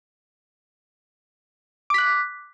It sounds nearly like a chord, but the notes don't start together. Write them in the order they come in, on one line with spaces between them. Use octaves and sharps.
D6 B6 F#6